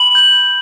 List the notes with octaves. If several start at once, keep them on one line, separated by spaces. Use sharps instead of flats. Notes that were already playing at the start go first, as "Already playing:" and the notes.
Already playing: B5 F#7
G6